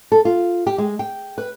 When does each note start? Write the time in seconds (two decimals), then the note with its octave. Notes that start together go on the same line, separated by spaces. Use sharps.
0.12 A4
0.25 F4
0.67 G4
0.78 G#3
0.99 G5
1.38 B4